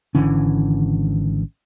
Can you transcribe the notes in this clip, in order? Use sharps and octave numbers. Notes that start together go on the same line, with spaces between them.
G#1 D3 E3 C#4